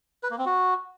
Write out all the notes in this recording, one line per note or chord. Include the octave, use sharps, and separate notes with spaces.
B4
A#3
C4
F#4